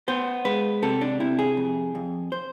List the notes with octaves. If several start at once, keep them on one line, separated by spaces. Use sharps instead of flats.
B3 C5
G#3 B4
C3 A4
D4
C3 E4
G#4
F2
F2
C5